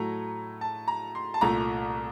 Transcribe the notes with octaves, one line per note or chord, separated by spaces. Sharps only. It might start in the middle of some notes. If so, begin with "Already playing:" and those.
Already playing: A2 F#3 A3 A#5
A5
A#5
C6
A5
C2 A#2 A3 A#5